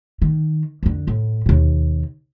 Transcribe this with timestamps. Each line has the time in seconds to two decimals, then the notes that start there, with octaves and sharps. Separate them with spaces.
0.22 D#3
0.83 F2 D3
1.07 A2
1.46 D#2 B2